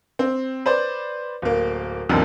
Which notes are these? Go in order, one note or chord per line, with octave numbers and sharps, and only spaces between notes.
C4
B4 C5 D5
D1 A#3
G1 D2 C3 D#3 F3